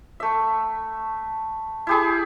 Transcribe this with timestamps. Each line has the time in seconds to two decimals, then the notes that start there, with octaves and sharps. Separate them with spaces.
0.20 A3 E5
1.87 E4 G4 G#4